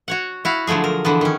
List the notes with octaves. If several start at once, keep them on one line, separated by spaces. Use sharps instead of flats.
F#4 C#5 F#5
E4 F#4 F5
D3 F3 F#3 A3 G#4
A#4
D3 E3 F3 B3
D#3 C#4